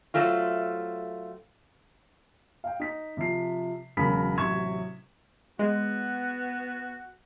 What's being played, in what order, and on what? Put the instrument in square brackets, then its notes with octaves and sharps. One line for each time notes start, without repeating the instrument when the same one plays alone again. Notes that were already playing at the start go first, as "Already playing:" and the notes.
[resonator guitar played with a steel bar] F#3 A3 C4 F4
[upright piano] F5 G5
D#4 B6
C3 F3 C7
E1 C#3 F#3 A#4 B5 B6
A1 C3 F#3 C#6 G#6 E7
[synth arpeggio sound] G#3 [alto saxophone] B3 [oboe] F#4